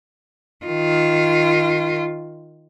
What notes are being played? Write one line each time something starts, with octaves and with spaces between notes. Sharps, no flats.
D#3 F4